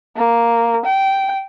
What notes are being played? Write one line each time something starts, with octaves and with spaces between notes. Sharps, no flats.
A#3
G5